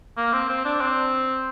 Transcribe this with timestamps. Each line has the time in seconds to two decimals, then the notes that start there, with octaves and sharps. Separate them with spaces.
0.17 A#3
0.33 C4
0.49 C4
0.65 D4
0.81 C4